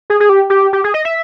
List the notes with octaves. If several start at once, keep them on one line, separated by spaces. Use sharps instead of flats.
G#4
G#4
G4
G4
G4
G#4
D#5
E5